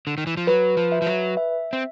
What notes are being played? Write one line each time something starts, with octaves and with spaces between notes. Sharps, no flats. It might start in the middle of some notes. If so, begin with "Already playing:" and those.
D3
D#3
E3
F3
F#3 B4
F3
E5
F3
F#3
E5
C4